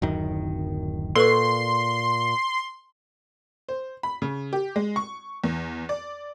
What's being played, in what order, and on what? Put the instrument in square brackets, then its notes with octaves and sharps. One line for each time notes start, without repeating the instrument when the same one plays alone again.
[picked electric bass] D1 F#2 D#3
[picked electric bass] A#2 [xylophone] A4 B4 C#6 [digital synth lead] C6
[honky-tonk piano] C5
B5
C#3
G4
G#3
C#6
E2
D5